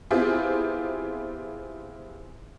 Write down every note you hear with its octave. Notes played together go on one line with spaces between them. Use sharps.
B3 C4 E4 F4 G4 G#4